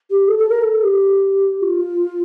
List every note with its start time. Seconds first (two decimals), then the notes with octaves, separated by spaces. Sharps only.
0.10 G4
0.28 A4
0.38 A4
0.49 A#4
0.61 A4
0.72 A4
0.83 G4
1.62 F4